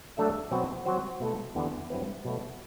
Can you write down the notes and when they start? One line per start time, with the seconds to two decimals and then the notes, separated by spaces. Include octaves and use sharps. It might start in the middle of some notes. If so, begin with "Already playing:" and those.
0.17 F#3 A3 D4 A4 E5
0.51 B2 F#3 C4 F#4
0.85 F#3 C4 F#4 C5
1.20 B2 A3 E4 A4
1.55 E2 D3 G3 B3
1.90 G2 F#3 C4 E4 B4
2.25 B2 F#3 A3